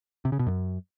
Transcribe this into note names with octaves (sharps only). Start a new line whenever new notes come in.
C3
C#3
B2
F#2